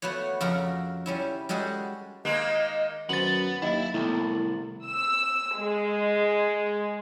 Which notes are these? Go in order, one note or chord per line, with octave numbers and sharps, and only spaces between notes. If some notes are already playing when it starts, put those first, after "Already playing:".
A3 B3 F#4 B4 C#5
F2 C#3 F#4 A#4 F#5
G3 C#4 E4
G3 G#3 F#4 G#4 A4
D#3 G#3 A#3 D#5
F#2 D#3 B3 C5 A6 F#7
D#2 F#3 A#3 E4 D#5 E5
C2 A2 D#3 B3
E6
G#3